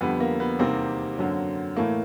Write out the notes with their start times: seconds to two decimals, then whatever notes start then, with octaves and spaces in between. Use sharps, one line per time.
0.01 F2 D3 G3 B3
0.20 A#3
0.40 B3
0.59 E2 C3 D#3 G3 A#3 C4
1.18 F#2 D3 F#3
1.76 A2 E3 A3 A#3